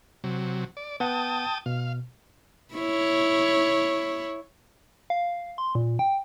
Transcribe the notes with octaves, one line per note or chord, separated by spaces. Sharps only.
C3 F#3
D5
B3 F#5 G5 A5 D#6
B2 F5
E4 C#5
F5
C6
A#2
G5